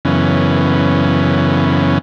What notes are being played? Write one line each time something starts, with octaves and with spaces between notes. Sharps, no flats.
F#2 C#3 E3 B3 C#4